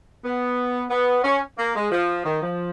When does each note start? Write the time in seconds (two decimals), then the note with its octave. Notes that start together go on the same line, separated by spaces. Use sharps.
0.23 B3
0.90 B3
1.23 C#4
1.57 A#3
1.75 G#3
1.91 F3
2.24 D#3
2.42 F3